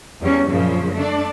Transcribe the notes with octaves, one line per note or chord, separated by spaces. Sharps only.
E2 G3 C#4
F#2 A#2 C#3 F3
A3 D4 D5